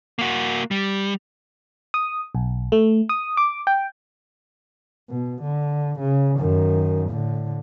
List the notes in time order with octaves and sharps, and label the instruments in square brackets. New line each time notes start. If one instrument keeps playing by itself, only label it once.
[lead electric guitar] A#3 F#4
G3
[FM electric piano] D#6
B1
A3
D#6
D6
G5
[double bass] B2
D3
C#3
F#2 D#3
A2 D3